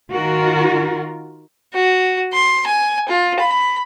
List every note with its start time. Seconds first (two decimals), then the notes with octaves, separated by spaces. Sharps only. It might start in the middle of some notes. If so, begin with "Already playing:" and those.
0.13 D#3 F4 F#4 A#4
1.74 F#4
2.34 C6
2.66 G#5
3.09 F4
3.40 B5